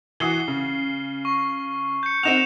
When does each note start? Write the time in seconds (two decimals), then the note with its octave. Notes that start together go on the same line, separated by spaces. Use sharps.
0.20 E3 F#4 D#6 C7 G7
0.48 C#3
1.25 C#6
2.03 G6 C#7
2.23 C4 D#4 F#5 C#7 E7 F7